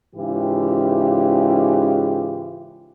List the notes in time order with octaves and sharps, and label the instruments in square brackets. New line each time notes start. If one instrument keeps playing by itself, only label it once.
[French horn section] G#2 C#3 E3 F4 G4